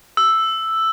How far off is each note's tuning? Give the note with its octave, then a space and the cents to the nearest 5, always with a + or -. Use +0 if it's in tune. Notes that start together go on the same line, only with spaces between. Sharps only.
E6 +0